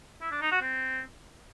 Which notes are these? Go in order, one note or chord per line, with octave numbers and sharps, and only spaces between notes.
E4
D4
D#4
F#4
C4